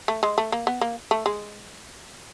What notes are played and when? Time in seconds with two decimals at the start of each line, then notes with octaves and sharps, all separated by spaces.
0.08 A3
0.23 G#3
0.38 A3
0.52 A#3
0.67 B3
0.81 A#3
1.11 A3
1.26 G#3